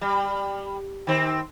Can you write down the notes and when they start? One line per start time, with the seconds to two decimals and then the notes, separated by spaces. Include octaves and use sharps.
0.01 G3
1.07 D#3 C4